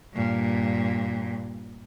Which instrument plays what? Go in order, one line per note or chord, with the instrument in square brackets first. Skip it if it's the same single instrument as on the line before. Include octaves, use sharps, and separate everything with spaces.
[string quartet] G2 A#2